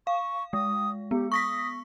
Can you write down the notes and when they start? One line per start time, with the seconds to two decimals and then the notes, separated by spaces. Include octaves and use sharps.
0.07 F5 C#6
0.53 G#3 D#6
1.11 B3 G4
1.32 C#6 D#6 A#6 B6